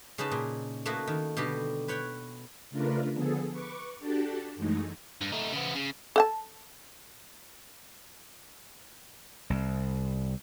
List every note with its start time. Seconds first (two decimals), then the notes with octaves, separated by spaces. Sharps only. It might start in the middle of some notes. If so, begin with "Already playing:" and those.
0.18 C#3 C#4 D#4 B4 D#5 A5
0.31 A#2 G#4
0.86 A3 A#3 E4 F#4 B4 D#5
1.07 D#3
1.37 B2 D3 G3 G4
1.88 B4 C#5 F#5 G5
2.70 C#3 A3 D4 F4 A#4 B4
3.12 D3 F3 B3 G#4 A4
3.51 B4 C#6 D6
4.00 D4 F#4 G4 A4 A5
4.56 F#2 E3 G#3 A3 D#4
5.21 G2
5.33 A3 D#4
5.53 C#3 B3
5.75 C#3
6.16 A4 F#5 A5
9.50 C2